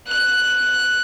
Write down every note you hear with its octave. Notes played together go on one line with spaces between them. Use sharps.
F#6